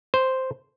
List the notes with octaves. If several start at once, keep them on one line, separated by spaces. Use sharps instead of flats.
C5